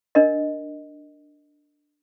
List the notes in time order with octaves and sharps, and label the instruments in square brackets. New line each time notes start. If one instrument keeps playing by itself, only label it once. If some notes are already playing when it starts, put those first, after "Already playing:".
[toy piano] D4 A#4 D#5